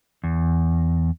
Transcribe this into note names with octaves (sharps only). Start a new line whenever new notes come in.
E2